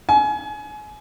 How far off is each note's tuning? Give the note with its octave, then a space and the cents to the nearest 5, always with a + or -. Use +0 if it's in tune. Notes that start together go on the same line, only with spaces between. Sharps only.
G#5 +25